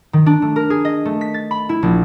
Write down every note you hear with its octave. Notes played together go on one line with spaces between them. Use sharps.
D#3
D4
A3
A#4
G#4
D#5
A3
B6
A6
B5
E4
A#1